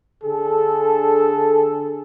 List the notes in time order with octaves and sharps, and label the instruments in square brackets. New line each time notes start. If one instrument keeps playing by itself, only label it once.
[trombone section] D3 G#4 A4